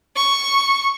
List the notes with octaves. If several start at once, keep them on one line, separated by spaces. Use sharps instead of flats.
C#6